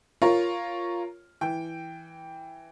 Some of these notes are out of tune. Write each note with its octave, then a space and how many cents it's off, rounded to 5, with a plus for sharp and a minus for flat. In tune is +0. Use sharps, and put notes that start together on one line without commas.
F4 +0 A#4 +0 C#5 -5
E3 +0 G5 +0